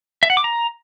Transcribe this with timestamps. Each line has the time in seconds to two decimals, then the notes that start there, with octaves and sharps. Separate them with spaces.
0.23 E5
0.30 F#5
0.37 D6
0.44 A#5